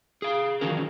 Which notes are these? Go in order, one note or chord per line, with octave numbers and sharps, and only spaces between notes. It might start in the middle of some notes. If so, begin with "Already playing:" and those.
G#4 F5
D#3 E3 F#3 C#4 A#4